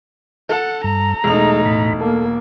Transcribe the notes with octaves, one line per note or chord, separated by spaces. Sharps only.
A4 F#5 A5
G2 A#5
E1 G#3 A3 D#4 F7
A2 B5
A#3 A4